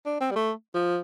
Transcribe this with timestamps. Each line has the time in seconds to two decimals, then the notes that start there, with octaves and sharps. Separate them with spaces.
0.05 D4
0.20 C4
0.31 G3
0.36 A3
0.74 F3